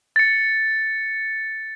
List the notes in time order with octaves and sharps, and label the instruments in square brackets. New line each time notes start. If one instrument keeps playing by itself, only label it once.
[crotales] A6 C#7